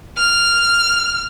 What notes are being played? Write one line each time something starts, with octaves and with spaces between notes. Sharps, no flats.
F6